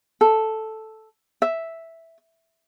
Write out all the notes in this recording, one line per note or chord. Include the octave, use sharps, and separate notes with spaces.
A4
E5